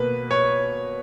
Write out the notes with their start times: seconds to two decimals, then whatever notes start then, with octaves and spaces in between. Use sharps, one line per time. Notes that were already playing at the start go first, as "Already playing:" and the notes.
Already playing: B2 A#3 B4
0.31 C#5